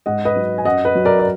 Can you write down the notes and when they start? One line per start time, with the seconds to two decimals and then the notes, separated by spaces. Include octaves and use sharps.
0.06 G#2 D#5 F#5
0.25 B4 D#5
0.36 F#3
0.58 G#5
0.65 F#2 D#5 F#5
0.85 B4 D#5
0.95 F#3
1.05 A#4 D5
1.19 D5